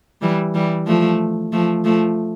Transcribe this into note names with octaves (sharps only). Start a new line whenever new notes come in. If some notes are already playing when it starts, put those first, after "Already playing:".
E3 G3
E3 G3
F3 A3
F3 A3
F3 A3